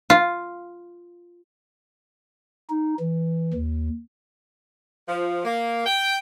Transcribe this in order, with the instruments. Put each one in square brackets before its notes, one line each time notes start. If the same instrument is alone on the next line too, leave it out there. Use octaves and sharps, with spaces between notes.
[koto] F4
[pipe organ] D#4
E3
D#2
[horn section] F3
A#3
G5